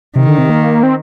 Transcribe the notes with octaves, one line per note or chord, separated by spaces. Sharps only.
C3 D#3
D3
C3
A#3
C4